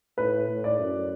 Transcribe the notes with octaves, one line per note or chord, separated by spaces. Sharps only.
A2 B4
A2
D5
F#2